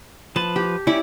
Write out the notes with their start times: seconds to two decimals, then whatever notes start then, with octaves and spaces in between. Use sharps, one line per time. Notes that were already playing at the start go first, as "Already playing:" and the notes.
0.36 F3 B4 A5
0.56 G4
0.87 C#4 E4 G4 D5